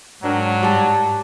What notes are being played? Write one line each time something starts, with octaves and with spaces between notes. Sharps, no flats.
G#2 F#3 D4 A#4 G5
G3 D5 A5